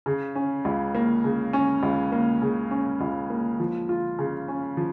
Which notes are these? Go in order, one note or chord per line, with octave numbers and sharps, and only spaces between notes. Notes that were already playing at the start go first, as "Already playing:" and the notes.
C#3
C#4
C#2
A#3
C#3
C#4
C#2
A#3
C#3
C#4
C#2
A#3
F3
F4
C#3
C#4
F3